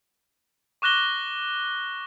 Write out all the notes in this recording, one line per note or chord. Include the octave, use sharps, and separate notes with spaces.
C#6 D6 F#6 A#6 G7